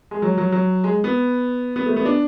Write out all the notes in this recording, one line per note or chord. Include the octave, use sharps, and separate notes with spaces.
G#3
F#3
F#3
F#3
G#3
B3
B3
A3
B3
D4